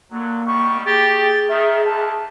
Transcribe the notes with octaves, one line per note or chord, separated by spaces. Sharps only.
D3 F#3 A#3
D#3 F#3 G3 C#6
G4 G#4 A6
D#3 E5
D#2 A5